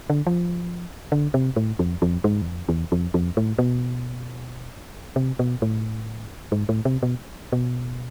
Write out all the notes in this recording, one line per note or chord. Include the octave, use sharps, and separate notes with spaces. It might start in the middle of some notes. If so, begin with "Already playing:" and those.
D3
F3
D3
C3
A2
F2
F2
G#2
E2
F2
E2
F2
F2
A2
B2
C3
B2
A2
G#2
A2
C3
B2
B2